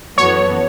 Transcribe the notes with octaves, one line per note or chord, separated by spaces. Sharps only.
F#2 E3 B3 F#4 A4 C#5